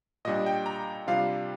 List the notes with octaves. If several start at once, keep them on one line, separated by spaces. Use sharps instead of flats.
A#2 G3 D4 D#5
G5
A#5
C3 G3 D4 F4 F5